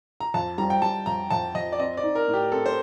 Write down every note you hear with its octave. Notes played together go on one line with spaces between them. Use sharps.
A#5
F2 A5
G3 A#5
G5
G3 A5
F2 A#5
F2 A5
F2 D#5
D5
C4 D#5
D5
D#4
A#4
A2
G4
C4 A4
C5